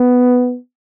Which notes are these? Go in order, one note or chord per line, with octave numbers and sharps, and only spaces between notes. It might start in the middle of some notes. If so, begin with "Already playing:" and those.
Already playing: B3